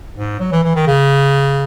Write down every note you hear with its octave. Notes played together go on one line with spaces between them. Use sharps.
G#2
F#3
E3
E3
D#3
C#3